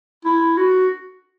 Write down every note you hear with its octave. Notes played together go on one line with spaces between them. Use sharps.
E4
F#4